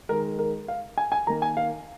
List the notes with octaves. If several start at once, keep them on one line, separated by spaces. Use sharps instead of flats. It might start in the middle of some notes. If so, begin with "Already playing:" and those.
D#3 G#3 A#4
A#4
F5
G#5
G#5
D#3 A#3 A#5
G#5
F5